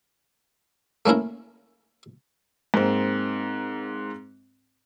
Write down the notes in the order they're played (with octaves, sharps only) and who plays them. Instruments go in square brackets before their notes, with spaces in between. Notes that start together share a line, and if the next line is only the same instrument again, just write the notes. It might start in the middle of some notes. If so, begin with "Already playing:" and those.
[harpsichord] A3 A#3 C#4 E4 A#4
[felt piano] G#2 A#3 C4